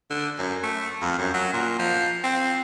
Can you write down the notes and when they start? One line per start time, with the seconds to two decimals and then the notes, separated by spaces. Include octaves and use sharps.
0.11 D3
0.38 F#2
0.63 A3
1.02 F2
1.19 F#2
1.34 F#3
1.53 A#2
1.79 F3
2.24 C4